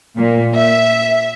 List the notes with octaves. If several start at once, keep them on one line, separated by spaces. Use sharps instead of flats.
A#2
E5